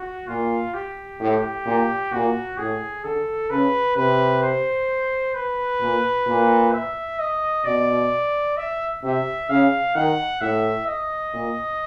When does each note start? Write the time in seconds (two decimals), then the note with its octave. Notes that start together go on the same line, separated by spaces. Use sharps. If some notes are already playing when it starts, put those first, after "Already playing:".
Already playing: F#4
0.28 A#2 F4
0.74 G4
1.20 A2
1.66 A#2
2.12 A#2 F#4
2.58 A2 G#4
3.04 D3 A4
3.50 C#3 B4
3.96 C3 B4
4.43 C5
5.35 B4
5.80 A#2
6.27 A#2
6.73 E5
7.20 D#5
7.65 B2 D5
8.57 E5
9.03 C3 E5
9.50 C#3 F5
9.95 D#3 F#5
10.41 A2 E5
10.87 D#5
11.33 A#2